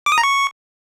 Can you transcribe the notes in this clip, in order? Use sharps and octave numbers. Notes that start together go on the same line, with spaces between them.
D6
D#6
A#5
C#6